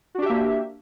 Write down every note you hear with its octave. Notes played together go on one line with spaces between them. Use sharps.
A#3 D4 F#4 G4 E5